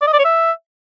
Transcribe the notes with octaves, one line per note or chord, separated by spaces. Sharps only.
D5
D#5
D5
C#5
E5